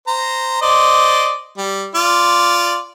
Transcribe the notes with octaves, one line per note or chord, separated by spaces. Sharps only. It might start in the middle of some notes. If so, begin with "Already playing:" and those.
C5 A#5
C5 D5 D#5
G3
F4 D5